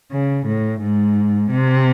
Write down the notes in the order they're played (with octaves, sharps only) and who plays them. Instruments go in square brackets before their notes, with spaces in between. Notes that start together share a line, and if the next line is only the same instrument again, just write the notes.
[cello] C#3
A2
G#2
C3